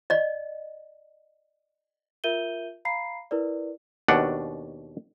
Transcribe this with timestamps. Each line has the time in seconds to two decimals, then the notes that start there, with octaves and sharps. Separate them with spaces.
0.10 D5 D#5
2.24 F4 A#4 E5 G6 D#7 G7
2.85 F5 A#5 B5 C7
3.31 E4 A#4 B4 D5
4.08 D#2 B2 D4 F#5